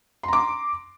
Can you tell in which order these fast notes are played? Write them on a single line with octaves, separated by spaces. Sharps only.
C6 A#5 D6